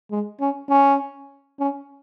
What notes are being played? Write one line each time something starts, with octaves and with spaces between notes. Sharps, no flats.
G#3
C#4
C#4
C#4